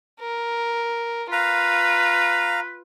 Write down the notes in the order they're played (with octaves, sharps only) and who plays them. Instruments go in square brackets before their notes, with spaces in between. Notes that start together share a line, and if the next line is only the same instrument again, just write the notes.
[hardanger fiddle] A#4
[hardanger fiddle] F4 [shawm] B4 [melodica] F5 A#5